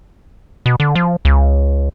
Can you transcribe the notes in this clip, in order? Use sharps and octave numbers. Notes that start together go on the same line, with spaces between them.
B2
D3
F3
C#2